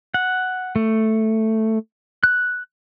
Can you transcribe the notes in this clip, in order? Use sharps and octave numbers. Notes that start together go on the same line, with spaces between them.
F#5
A3
F#6